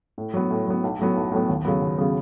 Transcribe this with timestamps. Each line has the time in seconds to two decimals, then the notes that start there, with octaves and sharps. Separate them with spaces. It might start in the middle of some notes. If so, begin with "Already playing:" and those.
0.18 A2
0.34 F#3 B3
0.51 A2
0.67 F#3 B3
0.84 B1
0.99 A2 F#3 B3
1.16 B1
1.32 A2 F#3 B3
1.49 D#2
1.65 C#3 F#3 B3
1.82 D#2
1.98 C#3 F#3 B3